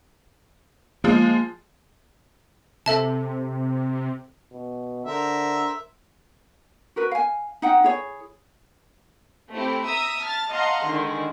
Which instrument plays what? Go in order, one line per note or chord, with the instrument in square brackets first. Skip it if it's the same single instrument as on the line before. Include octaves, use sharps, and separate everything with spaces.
[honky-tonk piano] F3 G#3 [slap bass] A#3
[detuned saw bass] C3 [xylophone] A4 E5 A5
[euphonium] B2
[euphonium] D3 [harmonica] A#4 C5 E5
[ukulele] F#4 A#4 B4
F5 G#5
D#4 F#5 G5
E4 G#4 C#5
[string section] A3 C4 E4 G4
E5 A#5 D#6 E6
A5 F6 A6
D#5 F5 F#5 A5 A#5 C6
D3 D#3 G#3 E4